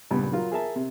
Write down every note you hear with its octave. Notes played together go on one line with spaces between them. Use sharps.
C#2 G2 A#2 B3
F#3 F4 A#4
G#4 A#4 E5 A5
C3